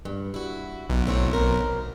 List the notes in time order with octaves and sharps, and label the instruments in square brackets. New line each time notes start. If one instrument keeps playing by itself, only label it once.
[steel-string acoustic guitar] G2
E4 F#4
[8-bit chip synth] B1
[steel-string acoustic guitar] A2 C4 C#5
A#4 C5